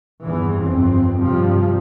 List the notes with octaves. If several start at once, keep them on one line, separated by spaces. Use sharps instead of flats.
E2 G2 E3
G1 F2 C4
G2 C3 F3 G3